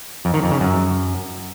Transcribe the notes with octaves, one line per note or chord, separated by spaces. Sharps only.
F2
D#3
F2
C#3
F#2